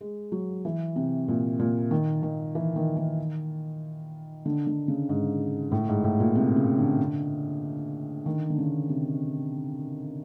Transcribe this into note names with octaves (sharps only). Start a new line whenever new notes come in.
G#3
F#3
E3
C3
A#2
A#2
D#3
D#3
E3
D#3
D#3
D3
D3
C#3
G#2
A2
G#2
A2
A#2
C3
C#3
D3
D#3
D3
C#3
C3